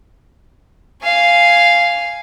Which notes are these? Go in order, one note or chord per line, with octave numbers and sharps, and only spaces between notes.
F5 G#5